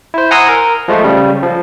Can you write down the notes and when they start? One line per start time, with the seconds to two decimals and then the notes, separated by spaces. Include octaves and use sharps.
0.14 E4 C5
0.31 F#5 G#5 A#5 C6 D#6 E6
0.49 A#4
0.88 F3 G#3 A3
1.04 C#3 G3
1.43 F3